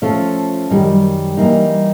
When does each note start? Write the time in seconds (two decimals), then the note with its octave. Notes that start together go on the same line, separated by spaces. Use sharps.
0.02 F3 A3 C#4 F4 A4
0.70 F#2 D#3 G3
1.37 G2 E3 G3 A#3 D#4